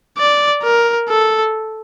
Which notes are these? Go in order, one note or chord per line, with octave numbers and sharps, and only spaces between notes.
D5
A#4
A4